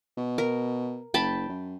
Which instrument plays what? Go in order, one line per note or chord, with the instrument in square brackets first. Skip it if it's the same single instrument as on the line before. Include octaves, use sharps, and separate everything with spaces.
[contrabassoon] B2
[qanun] A#4
[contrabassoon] F#1 [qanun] G5 A5 B5
[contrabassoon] F#2